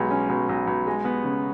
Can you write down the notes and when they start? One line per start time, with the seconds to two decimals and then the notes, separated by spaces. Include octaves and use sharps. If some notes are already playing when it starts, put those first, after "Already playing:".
Already playing: B1 G#3
0.10 C#4
0.29 B1
0.49 B1
0.67 B1
0.87 G#3
1.05 B3
1.24 C#3